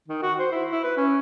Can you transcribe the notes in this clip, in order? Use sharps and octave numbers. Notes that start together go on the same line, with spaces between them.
D#3
F#4
C5
E4
E4
B4
C#4